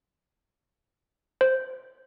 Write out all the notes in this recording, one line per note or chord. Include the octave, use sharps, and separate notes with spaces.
C5